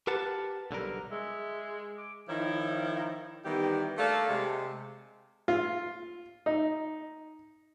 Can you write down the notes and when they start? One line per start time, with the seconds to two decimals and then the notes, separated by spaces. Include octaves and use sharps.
0.07 G4 A#4 B4 F#5 A5
0.71 B1 D3 G3 A#4
1.11 G#3 E5
1.98 D6
2.28 D#3 F3 D#4 E4 C#5
3.44 D#3 E3 G3 B3 G4
3.97 A3 A#3 D4 A4 F5
4.27 C3 G#3
5.48 F4
6.46 D#4